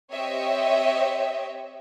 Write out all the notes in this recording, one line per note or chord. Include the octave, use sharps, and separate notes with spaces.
C4 G4 C#5 D#5 E5